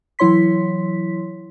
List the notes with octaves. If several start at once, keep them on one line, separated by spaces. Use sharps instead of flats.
E3 F#3 E4 C#5 C6 B6